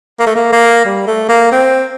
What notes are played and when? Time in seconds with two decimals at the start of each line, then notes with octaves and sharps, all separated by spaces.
0.19 A#3
0.27 A3
0.36 A#3
0.52 A#3
0.85 G3
1.07 A3
1.29 A#3
1.52 C4